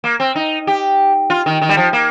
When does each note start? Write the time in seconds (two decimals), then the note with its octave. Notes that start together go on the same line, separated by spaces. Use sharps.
0.04 A#3
0.20 C4
0.35 D#4
0.67 G4
1.30 F4
1.46 D#3
1.61 D#3
1.69 G3
1.77 F3
1.93 A#3